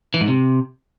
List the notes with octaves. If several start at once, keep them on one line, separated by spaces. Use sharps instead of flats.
E3
G#2
C3